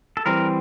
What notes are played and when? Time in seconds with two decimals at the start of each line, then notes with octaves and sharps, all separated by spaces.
0.17 A4
0.26 E3 G3 C4 A#4